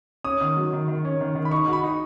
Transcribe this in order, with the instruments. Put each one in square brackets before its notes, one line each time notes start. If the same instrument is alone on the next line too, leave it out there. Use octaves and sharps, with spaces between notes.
[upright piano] C#4 [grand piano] D#6
[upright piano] D#3
F#3
D#3
D#3
C#4
D#3
D#3
[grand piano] B5
[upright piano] D#4 [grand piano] C#6
[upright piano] F#4
[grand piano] B5
[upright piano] D#4